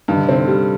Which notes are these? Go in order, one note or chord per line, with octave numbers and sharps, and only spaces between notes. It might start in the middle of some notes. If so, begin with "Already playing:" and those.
G2 D#3
D3
C3
D3 C4
G3